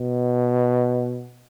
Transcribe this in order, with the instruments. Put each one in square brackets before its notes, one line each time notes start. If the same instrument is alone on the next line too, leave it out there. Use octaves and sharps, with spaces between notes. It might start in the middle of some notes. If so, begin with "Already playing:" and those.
Already playing: [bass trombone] B2